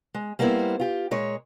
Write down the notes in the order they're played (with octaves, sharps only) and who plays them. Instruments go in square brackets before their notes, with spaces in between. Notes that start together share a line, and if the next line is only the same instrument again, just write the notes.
[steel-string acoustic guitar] G#3
G3 A#3 B3 D4 E4 C5
F4 G4
A#2 G#3 C#5